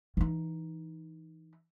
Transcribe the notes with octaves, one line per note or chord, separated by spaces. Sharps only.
E3 D#4